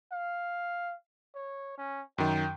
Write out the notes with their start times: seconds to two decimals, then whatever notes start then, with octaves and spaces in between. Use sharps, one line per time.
0.12 F5
1.35 C#5
1.78 C#4
2.18 F#2 D#3 G5